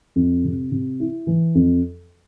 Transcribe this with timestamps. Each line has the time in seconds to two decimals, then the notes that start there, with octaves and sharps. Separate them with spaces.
0.16 F2
0.44 C3
0.72 C3
1.00 E4
1.27 E3
1.55 F2